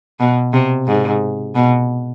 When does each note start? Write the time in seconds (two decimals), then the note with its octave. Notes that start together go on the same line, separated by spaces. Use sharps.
0.20 B2
0.53 C3
0.87 G#2
1.55 B2